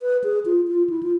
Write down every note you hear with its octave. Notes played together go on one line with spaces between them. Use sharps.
B4
G#4
F4
F4
E4
F4